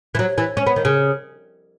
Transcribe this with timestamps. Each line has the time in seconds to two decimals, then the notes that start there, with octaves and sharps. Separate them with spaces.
0.15 E3
0.19 F#3
0.38 E3
0.57 C#4
0.67 B3
0.76 D#3
0.85 C#3